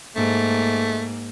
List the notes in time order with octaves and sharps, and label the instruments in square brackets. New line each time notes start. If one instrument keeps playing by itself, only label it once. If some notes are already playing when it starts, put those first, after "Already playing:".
[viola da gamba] G#2 A#3 [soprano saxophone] A3